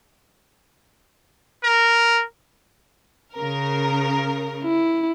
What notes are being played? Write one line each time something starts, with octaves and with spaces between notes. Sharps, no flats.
A#4
C#3 A#4
E4